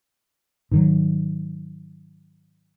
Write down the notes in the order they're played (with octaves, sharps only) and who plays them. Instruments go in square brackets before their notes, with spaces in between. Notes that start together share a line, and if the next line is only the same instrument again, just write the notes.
[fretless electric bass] G#2 D#3 F#3